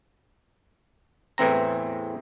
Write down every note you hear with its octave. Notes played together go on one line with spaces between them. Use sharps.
E2 A2 E3 C4 A#5